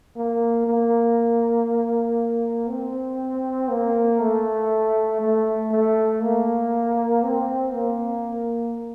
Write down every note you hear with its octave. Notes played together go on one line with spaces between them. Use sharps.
A#3
A#3
C4
A#3
A3
A3
A3
A#3
C4
A#3